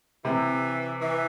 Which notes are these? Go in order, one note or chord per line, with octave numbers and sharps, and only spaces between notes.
C3 E3
E3